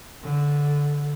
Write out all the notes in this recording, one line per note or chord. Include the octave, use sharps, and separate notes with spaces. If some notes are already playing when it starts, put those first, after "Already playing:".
D3